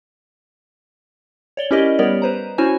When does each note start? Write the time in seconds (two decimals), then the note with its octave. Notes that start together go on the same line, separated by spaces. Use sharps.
1.57 C#5 D5 G7
1.71 C#4 E4 G4 A#4 D5 D#5
1.99 G3 B3 G4 A#4 C#5 D5
2.22 B4 C5 A#5
2.58 C#4 E4 F#4 C5 C#5 G#5